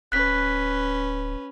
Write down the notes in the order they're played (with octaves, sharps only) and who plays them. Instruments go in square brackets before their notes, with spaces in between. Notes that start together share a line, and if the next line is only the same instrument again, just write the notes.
[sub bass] D1 [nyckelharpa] C#4 B4 [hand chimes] F#6 B6